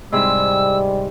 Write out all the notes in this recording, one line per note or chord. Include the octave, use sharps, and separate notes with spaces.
G#2 C3 G3 E4 E6